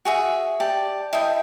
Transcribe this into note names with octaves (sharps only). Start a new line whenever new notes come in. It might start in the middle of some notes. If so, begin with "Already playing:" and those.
F#4 G#4 E5
G4 D5 A5
E4 A4 D#5 G5